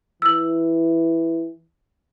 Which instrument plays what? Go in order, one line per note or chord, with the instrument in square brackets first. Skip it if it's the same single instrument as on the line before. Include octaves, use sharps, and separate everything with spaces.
[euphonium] E3 [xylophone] E6 F#7